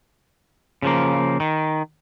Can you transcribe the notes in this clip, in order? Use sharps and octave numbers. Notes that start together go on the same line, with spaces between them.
C#3 F3 A#3
D#3